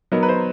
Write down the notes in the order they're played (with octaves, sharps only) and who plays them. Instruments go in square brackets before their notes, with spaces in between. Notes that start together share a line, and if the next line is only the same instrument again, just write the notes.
[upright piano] F#3 B3 D#4 A#4
B4
C5